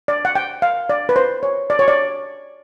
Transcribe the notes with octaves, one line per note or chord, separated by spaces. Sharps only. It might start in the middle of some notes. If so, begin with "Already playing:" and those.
D5
F#5
G5
F5
D5
B4
C5
C#5
D5
C#5
D5